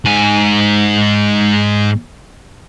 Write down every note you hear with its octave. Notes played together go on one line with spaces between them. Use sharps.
G#2 G#5